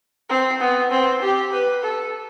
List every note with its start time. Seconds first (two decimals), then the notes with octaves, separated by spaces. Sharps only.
0.30 C4
0.60 B3
0.91 C4
1.22 G4
1.52 B4
1.83 A4